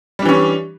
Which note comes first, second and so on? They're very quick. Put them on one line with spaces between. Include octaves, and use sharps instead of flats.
G3 D4 E3 C#4